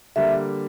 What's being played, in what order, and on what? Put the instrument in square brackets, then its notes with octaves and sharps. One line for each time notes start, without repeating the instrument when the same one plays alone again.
[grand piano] D3 G3 A#3 [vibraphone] E5